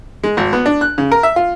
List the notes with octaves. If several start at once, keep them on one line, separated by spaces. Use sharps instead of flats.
G#3
G#1
B3
D4
F#6
C#3
A#4
E5
F4